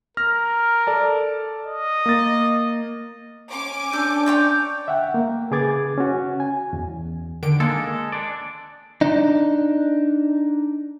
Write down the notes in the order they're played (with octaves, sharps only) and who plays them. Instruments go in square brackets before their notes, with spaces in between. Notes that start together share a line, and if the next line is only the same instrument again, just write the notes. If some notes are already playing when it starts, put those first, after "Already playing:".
[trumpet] A#4 [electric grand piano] F6 A#6
[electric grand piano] A4 D5 A5
[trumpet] D#5
[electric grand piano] A#3 A6
[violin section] C#4 G#5 D6
[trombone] D4 [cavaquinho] A4 [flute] G6
[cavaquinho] C#5 D5 G5
[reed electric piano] E5 F#5 G5
A#3
C#3 G#4 B4 D6 G#6 A6
C#4 F#4
G#5
E2
[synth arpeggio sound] D3 D#3 D7
[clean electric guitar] G#3 A4 [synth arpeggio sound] A#3
[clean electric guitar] D4 D5
D4 D#4